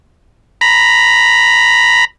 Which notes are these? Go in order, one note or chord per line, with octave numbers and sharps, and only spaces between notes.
A#5 B5